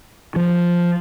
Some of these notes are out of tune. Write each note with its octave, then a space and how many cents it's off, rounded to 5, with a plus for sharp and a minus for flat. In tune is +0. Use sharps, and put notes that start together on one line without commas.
F3 +0